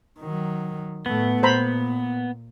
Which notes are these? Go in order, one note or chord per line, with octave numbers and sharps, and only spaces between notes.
D#3 F#3
A2 A3 B3
A#2 C5 A#5 B5